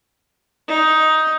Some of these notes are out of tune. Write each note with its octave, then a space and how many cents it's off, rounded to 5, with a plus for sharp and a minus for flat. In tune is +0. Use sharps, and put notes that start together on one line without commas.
D#4 +10